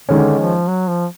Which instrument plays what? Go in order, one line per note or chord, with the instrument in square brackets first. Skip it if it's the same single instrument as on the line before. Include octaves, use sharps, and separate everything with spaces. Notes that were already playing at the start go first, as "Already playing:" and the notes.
[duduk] D3 [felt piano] D#3 G#3 C#4
[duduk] F3
F#3
F3